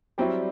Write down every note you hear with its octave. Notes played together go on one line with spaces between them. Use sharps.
F#3 G3 C4 E4